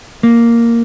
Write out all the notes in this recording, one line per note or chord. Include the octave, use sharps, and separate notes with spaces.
A#3